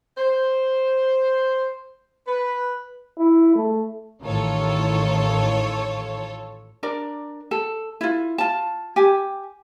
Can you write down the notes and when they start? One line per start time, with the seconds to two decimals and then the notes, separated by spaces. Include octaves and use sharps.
0.17 C5
2.26 B4
3.18 E4
3.55 A3
4.23 A1 A2 D#3 F4 A4 C#5
6.83 D4 A#4 D5
7.51 A4
8.01 E4 F4
8.38 F4 A5
8.96 G4 G#5